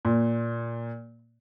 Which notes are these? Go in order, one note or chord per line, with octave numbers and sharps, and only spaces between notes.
A#2